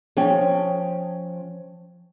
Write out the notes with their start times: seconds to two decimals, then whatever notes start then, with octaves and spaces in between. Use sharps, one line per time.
0.17 F3 C#4 G5